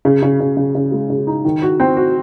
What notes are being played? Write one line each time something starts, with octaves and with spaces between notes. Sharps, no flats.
C#3
C#3
C#3
C#3
C#3
G#3
C#3
D#4
D#3
F#4
C4
F#4